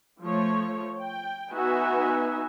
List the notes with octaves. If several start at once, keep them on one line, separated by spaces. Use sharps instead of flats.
F3 A3 C#5
G5
B3 D#4 F#4 B4 E5 G#5